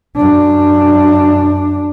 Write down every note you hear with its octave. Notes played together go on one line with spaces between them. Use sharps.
F#2 D4